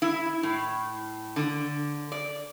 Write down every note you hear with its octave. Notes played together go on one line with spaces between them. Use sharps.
E4
A2
D3
D5